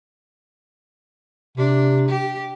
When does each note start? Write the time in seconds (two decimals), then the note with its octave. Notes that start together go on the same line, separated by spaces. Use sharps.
1.58 C3 D4
2.08 G4